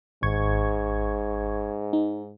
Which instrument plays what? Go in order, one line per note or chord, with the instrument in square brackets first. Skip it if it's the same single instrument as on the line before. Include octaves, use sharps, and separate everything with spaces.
[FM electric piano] G#1 C#6 G#6 [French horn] G#2
[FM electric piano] D#4